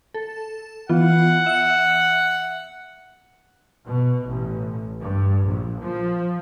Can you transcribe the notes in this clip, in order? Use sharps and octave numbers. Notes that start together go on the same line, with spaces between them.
A4
E3 B3 F4 F#5
E5 C#7
B2
A1
G2
A#1
F3